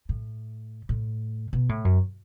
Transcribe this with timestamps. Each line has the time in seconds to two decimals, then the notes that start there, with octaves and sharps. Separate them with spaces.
0.09 A2
0.89 A2
1.53 B2
1.69 A2
1.85 F#2